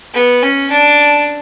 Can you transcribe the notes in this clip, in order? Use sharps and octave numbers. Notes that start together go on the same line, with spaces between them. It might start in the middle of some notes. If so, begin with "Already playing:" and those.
B3
C#4
D4